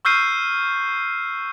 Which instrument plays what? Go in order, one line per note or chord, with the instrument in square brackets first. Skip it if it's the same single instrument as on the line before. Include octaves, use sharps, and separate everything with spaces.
[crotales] C#6 E6 F6 G6 C7 D#7